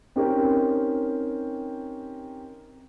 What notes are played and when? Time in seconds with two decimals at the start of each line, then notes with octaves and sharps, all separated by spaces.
0.16 C4 C#4 D#4 G4 A#4